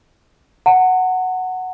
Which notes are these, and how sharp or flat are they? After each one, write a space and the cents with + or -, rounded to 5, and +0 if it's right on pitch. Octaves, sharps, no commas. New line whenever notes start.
F#5 +0 A#5 -45